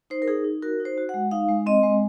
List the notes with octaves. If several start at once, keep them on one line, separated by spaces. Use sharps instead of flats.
D#4 C5
A#4
D#4 G#4
D#4
F#4 A#4
D#4
C5
F#4
G#3 F#5
D#4 F5
G#3
C4 D#5
G#3